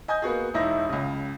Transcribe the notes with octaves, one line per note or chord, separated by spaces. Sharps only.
D#5 G#5 D#6 G6
A#3 B3 F#4 G#4
E1 D#4 E4 A#6
C#2 C#3